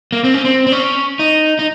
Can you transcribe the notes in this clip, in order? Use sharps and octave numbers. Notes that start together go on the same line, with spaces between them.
A#3
C4
C#4
C4
C4
C#4
D#4
D#4